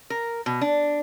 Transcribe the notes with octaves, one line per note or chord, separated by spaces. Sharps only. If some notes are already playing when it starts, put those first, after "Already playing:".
A#4
B2
D4